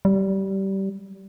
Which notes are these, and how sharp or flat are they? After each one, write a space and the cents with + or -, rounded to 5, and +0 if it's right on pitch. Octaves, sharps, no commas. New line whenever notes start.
G3 -20